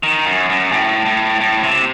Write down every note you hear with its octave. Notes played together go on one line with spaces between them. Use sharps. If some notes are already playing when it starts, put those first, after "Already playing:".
D#3
F#2
F#2
A2
A2
A2
C3